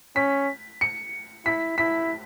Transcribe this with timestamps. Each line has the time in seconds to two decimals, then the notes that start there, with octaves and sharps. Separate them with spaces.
0.16 C#4 B6
0.81 C#7
1.46 E4 B6
1.78 E4 B6